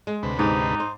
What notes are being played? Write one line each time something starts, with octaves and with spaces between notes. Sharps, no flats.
G#3
D2 C3 B4
G#2 G#3 D#4 G4
C5